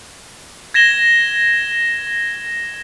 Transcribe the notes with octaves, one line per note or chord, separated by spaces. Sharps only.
G#6 A#6 E7 G7